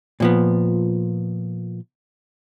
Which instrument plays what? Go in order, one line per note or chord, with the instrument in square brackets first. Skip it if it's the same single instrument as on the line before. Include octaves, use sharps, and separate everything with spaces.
[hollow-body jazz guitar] A#2 F3 B3